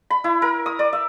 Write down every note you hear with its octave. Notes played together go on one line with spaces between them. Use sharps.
B5
E4
A#4
D#6
D5
E5